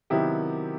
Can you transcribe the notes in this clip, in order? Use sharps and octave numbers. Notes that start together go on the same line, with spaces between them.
C3 D#3 F#3 B3 E4 G4